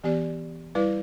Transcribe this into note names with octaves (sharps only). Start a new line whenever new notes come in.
E3 B3 G4 D5
G3 E4 B4 D5